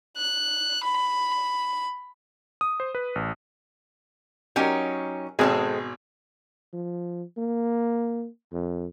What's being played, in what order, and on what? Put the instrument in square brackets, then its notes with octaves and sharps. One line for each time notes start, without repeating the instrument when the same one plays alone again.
[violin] F#6
B5
[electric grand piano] D#6
C5
B4
A1
[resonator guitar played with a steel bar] F#3 C#4 D#4 [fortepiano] G4 A#4
[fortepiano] G#1 B2 G#4 [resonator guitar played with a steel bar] G#3 C4 A4
[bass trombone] F3
A#3
F2